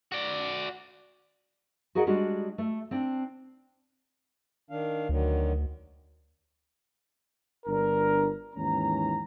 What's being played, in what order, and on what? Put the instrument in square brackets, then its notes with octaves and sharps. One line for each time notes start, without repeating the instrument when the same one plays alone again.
[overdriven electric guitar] F#4 D5
[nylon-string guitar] F#4 G#4 A#4 D#5 F#5
G3 G#3 D4 F#4
A3
C4 D4
[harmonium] D#3 D4 F5
[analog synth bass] D2 [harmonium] D3 D#3 F#3
[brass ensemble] G1 D4 A#4
D#2 G#2 E3 C#4 A#5